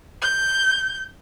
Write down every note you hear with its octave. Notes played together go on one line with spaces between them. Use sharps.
G6